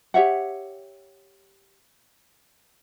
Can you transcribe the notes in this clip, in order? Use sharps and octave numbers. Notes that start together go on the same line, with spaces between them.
G4 C#5 E5 F#5